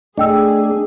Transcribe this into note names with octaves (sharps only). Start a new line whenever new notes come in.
A3 D4 G#4 D#5 G5 E6